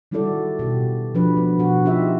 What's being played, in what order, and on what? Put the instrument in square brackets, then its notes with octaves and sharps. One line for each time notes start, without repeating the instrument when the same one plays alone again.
[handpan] D#3 G3 E4 F#4 A4 D5
B2 G4
F3 D4 B4
B3
B2 F#4
D#4 F4 G4 E5